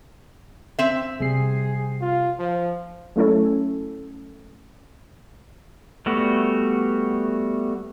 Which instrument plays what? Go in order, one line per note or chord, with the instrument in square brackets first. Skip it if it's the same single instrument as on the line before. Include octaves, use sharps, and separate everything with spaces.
[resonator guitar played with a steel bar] C4 E5
[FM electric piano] C3 G3 C7 [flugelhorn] G#4
[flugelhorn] F4
F3
[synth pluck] F#3 A3 C#4 E4 A4 C#5
[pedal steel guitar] G3 A3 B3 F#4